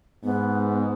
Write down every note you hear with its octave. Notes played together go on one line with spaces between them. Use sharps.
G#2 B3